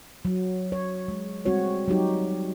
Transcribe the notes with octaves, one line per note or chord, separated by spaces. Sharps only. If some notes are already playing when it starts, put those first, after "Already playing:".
F#3
C#5
G#3
G3 G#3 C4 F#4 C#5
F#3 G3 D#4 G4